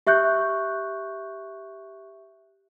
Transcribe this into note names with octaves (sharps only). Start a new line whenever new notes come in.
G4 E5 C#6 F#6 G6